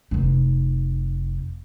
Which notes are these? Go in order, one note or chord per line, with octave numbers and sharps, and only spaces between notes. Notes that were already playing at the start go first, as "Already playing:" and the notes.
F1 D#4